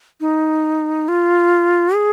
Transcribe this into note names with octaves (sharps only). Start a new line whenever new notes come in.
D#4
F4
G#4